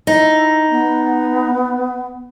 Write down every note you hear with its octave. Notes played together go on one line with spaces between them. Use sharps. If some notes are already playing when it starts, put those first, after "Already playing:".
D#4 E4
B3